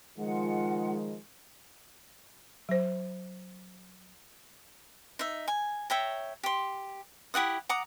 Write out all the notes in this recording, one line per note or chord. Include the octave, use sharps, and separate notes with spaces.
D#3 F3 G#3 F4 F#5
F#3 C5
D#4 E5
G#5
C#5 E5 G5 A#5
G4 C6
E4 G4 F#5 D#6
F#5 A#5 D6 D#6